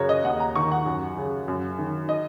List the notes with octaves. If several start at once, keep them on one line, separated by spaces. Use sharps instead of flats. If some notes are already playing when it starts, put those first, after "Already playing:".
Already playing: F#2 C#3 F#4 A#4 C#5
D#5
D#2 F#5
A#5
D#3 C#6
F#5
F#2
C#3
F#2
D#3
D#5